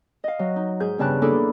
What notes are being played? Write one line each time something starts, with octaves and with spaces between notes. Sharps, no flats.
D#5 F5
F#3
D#4
G#2 G#4 G6
E2 G2 C#3 A5 F#6
A#3 D4 E4 G#4 A4